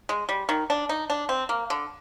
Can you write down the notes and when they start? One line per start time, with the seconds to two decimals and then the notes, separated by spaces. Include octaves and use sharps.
0.09 G#3
0.29 G3
0.49 D#3
0.70 D4
0.89 D#4
1.10 D4
1.29 C4
1.49 A#3
1.70 D3